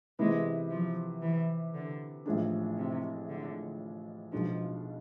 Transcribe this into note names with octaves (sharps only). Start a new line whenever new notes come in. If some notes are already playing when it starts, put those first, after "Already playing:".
C3 E3 G#3 B3 E4
F3
E3
D3
A1 A2 F3 G#3 D4
C3
D3
B1 B2 F3 G#3 D4